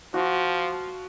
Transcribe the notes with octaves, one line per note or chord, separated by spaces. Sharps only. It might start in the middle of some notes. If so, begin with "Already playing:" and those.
F3 F#4